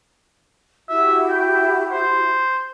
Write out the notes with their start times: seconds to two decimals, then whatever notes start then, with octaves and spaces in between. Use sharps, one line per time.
0.89 E4 F#4 G4 E5
1.30 G5
1.91 C5